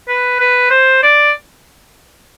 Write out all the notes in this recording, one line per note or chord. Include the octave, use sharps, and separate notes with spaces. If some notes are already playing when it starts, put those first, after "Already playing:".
B4
B4
C5
D5